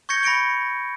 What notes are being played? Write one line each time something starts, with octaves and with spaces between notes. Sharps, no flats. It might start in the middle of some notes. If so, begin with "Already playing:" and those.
C#6 G6 G#6 A#6 C#7 G7
B5 A#6 C#7 D7 G7